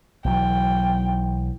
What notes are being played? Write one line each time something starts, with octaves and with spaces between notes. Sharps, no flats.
B1 E3 F#3 G5